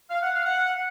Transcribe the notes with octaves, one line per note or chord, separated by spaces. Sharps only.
F5
F#5
F5
F#5